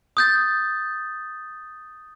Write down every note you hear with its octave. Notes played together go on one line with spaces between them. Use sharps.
D#6 G6 A6